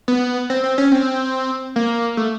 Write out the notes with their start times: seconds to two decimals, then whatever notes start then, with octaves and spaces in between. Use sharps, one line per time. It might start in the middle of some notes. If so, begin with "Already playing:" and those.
0.08 B3
0.50 C4
0.64 C4
0.78 C#4
0.92 C4
1.76 A#3
2.17 A3